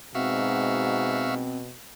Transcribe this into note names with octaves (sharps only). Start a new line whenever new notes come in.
G#2 B2 C4 F#4 E5 F5